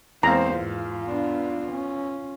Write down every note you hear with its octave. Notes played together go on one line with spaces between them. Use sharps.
E2 G#3 A#3 C4 C5 F5 A#5
G#2 F4
B3 D4
C#4